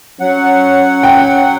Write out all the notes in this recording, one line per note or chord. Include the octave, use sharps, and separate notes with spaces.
F#3 C#4 C#5 F#5
G5